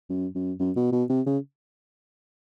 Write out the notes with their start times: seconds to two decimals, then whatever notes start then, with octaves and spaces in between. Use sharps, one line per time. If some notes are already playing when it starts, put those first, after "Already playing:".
0.10 F#2
0.35 F#2
0.59 F#2
0.76 B2
0.92 B2
1.09 C3
1.26 C#3